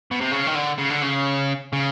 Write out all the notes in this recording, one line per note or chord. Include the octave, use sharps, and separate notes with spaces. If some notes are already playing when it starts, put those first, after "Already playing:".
B2
C3
C#3
D#3
D3
C#3
D3
C#3
C#3